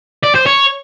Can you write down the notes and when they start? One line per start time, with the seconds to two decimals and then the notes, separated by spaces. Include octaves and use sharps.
0.24 D5
0.35 C5
0.46 C#5